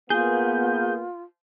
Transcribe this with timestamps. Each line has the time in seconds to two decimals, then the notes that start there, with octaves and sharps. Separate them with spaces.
0.10 A#3 B3 F4 G#4 G6